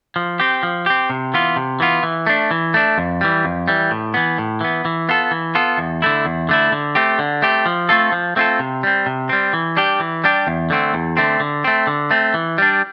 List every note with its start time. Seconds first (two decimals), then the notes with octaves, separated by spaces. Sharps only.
0.16 F3
0.40 C4 G4
0.63 F3
0.86 C4 G4
1.10 C3
1.34 E3 B3 F4
1.56 C3
1.80 E3 B3 F4
2.03 E3
2.27 A3 D4
2.51 E3
2.74 A3 D4
2.98 F2
3.21 E3 G3
3.45 F2
3.68 E3 G3
3.91 A2
4.14 E3 B3
4.38 A2
4.61 E3 B3
4.85 E3
5.09 B3 F4 A4
5.31 E3
5.55 B3 F4 A4
5.78 E2
6.02 D3 A3 E4
6.25 E2
6.49 D3 A3 E4
6.72 D3
6.95 A3 C4 G4
7.19 D3
7.42 A3 C4 G4
7.66 F3
7.89 A3 C4 F4 A4
8.12 F3
8.36 A3 C4 F4 A4
8.59 C3
8.83 G3 C4
9.06 C3
9.29 G3 C4
9.53 E3
9.77 G3 D4 G4
10.00 E3
10.24 G3 D4 G4
10.47 E2
10.70 D3 A3 C4
10.94 E2
11.17 D3 A3 C4
11.40 D3
11.64 A3 C4
11.87 D3
12.11 A3 C4
12.34 E3
12.58 G3 D4